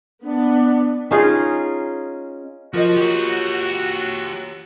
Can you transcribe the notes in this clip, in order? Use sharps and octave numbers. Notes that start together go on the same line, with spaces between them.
B3 D4
C#4 D#4 F4 G#4
F3 F4 F#4 A#4 D#5
G4 C#5